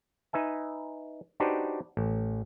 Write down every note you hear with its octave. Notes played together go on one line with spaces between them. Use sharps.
D#4 B4 E5 G#5
D4 D#4 F#4 G4 B4 C5
A1